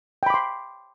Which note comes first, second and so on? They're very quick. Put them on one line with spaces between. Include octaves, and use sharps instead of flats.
G5 B5 D6 C6